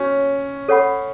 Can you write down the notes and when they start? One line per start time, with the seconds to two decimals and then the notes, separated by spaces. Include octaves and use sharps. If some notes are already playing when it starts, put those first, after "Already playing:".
Already playing: C#4 F#4 C#5
0.69 A4 C#5 F#5 B5